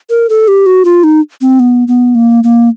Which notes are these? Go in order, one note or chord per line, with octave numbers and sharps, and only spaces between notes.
A#4
A4
G4
F#4
F4
D#4
C4
B3
B3
A#3
A#3